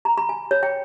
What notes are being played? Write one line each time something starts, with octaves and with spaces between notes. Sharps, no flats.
A#5
B5
G#5
C#5
G5